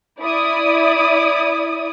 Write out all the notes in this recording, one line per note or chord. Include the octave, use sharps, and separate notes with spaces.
E4 D5 D#6